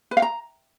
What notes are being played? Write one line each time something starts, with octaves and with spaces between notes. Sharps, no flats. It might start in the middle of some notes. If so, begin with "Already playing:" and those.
B4
F5
A#5